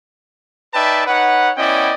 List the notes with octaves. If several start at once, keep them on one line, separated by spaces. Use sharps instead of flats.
D#4 B4 D5 E5 G5 A5
D#4 B4 C#5 F#5
B3 C#4 E4 D5 D#5 G5